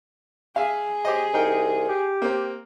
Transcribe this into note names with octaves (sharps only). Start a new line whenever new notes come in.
G#4 E5 F5
G4 C5 D#5
C2 D#4 A#4 G5
G4
A#3 C4